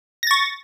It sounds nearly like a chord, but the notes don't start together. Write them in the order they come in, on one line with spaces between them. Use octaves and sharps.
A#6 A6 C#6